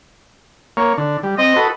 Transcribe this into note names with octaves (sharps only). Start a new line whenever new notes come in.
A#3 C#5
D3
G3
C4 D#5
F#4 A4 B4